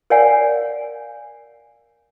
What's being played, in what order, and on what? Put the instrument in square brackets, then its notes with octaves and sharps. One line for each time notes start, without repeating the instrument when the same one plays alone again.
[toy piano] A#4 C#5 D5 F5 F#5 G#5